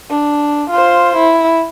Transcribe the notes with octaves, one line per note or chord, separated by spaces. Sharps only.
D4
F4 C5
E4